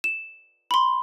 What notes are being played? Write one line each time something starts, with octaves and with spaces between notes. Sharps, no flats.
E7
B5 C6